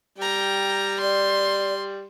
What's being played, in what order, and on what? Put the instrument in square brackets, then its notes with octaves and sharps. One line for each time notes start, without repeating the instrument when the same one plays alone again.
[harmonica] G3 [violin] G5 A#5
[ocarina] D5 [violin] C6